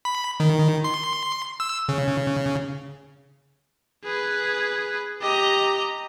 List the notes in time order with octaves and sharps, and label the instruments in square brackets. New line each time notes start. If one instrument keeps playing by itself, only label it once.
[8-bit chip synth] B5
D#3
C6
E6
C#3
[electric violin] G#4 B4
[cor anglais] G4 [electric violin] D#5 A#5